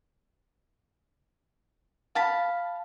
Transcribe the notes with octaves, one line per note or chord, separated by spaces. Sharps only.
F5 A5 B5